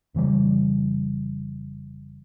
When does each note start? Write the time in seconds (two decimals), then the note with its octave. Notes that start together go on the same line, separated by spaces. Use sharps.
0.15 F1 C#3 E3 G3